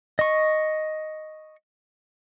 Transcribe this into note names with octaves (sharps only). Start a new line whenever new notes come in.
D#5 C#6